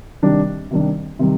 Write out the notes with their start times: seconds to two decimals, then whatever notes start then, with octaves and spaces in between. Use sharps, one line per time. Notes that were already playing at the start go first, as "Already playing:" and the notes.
0.22 C3 D#3 G3 D4
0.71 C3 D#3 G3 D4
1.19 C3 D#3 G3